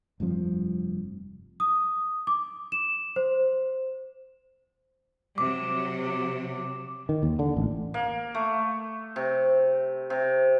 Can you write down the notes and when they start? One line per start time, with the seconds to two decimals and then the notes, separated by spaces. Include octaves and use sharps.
0.20 F1 G2 C3 F3
1.60 D#6
2.27 D6
2.72 E7
3.16 C5
5.38 C3 F#3 D6
7.09 D#3
7.23 D#2
7.39 D3
7.57 A1
7.94 A#3
8.35 A3
9.16 C3
10.10 C3